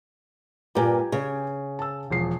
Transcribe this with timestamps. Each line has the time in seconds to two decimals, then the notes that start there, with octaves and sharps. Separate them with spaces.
0.75 G2 A#2 G4 B4 G#5
1.12 C#3
1.79 A5 E6
2.10 E1 F3 C7